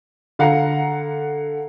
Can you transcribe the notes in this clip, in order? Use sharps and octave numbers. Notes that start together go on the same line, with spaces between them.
D3 F5 F#5 A#5